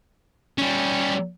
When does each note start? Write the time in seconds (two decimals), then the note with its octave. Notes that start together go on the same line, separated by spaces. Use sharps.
0.58 G3 C#4